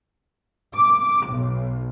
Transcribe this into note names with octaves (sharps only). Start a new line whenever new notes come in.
D6
B1